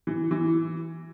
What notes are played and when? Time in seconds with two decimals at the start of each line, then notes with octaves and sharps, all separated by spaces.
0.07 E3
0.31 E3